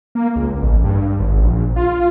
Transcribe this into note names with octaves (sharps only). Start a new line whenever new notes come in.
A#3
C#2
A1
G2
G#1
A#1
F4